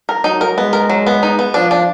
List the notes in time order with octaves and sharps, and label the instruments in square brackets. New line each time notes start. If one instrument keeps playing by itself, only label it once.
[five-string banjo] A#4
[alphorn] F#3 [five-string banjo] D#4
[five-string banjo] A#4
[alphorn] G#3 [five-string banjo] B3
[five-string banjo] A#4
F#3
B3
D#4
B3
[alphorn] F3 [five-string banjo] D4
[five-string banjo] D4